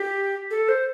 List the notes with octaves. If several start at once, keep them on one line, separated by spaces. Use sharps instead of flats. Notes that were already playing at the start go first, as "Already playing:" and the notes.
Already playing: G4
A4
C5